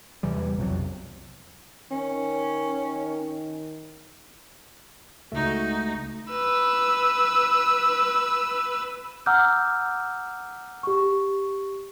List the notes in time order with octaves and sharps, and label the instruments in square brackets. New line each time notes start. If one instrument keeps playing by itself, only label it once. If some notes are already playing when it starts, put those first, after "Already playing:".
[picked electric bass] E2 C3 E3 G3
B1 F2 C3 F#3
[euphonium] D#3 [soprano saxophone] C#4
[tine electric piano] C#2 A3 [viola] D#4 F#4
[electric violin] B4 E6
[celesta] F#5 A#5 D6 E6 F6 G6
G4 C#6